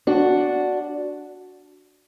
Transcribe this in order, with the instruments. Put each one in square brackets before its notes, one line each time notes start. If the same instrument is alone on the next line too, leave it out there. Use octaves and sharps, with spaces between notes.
[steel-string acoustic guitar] D4 F#4